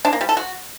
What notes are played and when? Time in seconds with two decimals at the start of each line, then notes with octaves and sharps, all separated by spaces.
0.05 D4
0.13 A#3
0.21 G3
0.29 A4
0.37 F#4